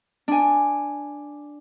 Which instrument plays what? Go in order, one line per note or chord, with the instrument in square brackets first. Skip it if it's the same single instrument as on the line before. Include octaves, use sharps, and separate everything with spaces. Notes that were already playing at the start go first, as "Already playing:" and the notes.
[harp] D4 G#5